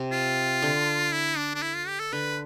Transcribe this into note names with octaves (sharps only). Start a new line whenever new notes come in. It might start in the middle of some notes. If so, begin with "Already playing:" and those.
Already playing: C3
F4
D3
E4
D4
D4
E4
F4
G4
A4
D3 B4